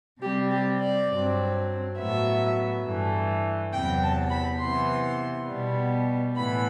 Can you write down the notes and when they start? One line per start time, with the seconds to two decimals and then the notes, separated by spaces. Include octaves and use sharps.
0.21 C3 G3 C4 G4
0.50 G4
0.80 D5
1.09 G2 F#3 C4
1.97 A2 F#3 B3 E5
2.84 G2 E3 A3
3.73 E2 C3 F#3 B3 G5
4.02 A5
4.30 B5
4.60 C3 E3 B3 C6
5.48 B2 G3 B3
6.36 A2 E3 B3 B5